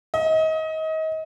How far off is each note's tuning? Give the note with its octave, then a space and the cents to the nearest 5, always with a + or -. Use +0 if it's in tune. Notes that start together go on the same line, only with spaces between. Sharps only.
D#5 +30